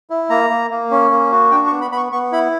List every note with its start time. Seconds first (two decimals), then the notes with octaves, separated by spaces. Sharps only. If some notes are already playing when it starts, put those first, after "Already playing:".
0.10 E4
0.30 A#3 A#5
0.50 A#3
0.71 A#3
0.91 C#4
1.11 A#3
1.32 F#4
1.51 D4 G5
1.67 C#6
1.72 B3
1.81 B5
1.91 B3 B5
1.97 C#6
2.12 B3 C#6
2.32 E4 B5